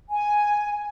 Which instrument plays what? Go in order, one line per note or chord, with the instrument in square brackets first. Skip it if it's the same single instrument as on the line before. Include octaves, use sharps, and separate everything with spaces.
[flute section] G#5